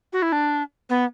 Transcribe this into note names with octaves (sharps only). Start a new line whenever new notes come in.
F#4
E4
D4
B3